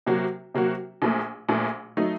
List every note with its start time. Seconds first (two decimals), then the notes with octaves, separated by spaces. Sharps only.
0.07 C3 F#3 A#3 F#4
0.54 C3 F#3 A#3 F#4
1.02 A#1 A#2 A3
1.48 A#1 A#2 A3
1.97 F#3 A3 D#4